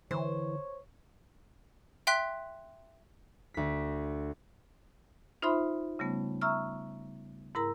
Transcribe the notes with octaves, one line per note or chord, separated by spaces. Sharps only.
D3 E3 C5 C#5
E5 G5 C6 F#6 B6
D2 B6
D#4 F4 C5 E5 B5 C6
C#3 G3 A3 B3 C#4
E5 A#5 C#6 E6 F6
G#2 E4 A#4 A#5 E6